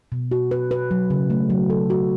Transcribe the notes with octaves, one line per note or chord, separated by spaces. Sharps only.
B2
F#4
B4
B4
F#3
C#3
A3
F#3
A4
F#4